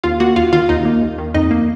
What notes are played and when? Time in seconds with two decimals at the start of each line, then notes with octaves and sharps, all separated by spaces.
0.04 D#2 F4 F5
0.20 A#3 F#4 F#5
0.36 D#2 F4 F5
0.53 D#3 F4 F5
0.69 D#2 D#4 D#5
0.85 A#3
1.02 D#2
1.18 D#3
1.34 F2 D#4 D#5
1.51 A#3